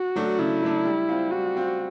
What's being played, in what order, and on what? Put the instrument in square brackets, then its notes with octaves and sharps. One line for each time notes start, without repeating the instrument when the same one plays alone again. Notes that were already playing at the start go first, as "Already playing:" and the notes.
Already playing: [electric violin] F#4
[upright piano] F#3 A3 D4
[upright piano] C#3 [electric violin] E4
[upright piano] F#3 A3 D4
G3
C4 F4
[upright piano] G3 [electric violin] F#4
[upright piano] C4 F4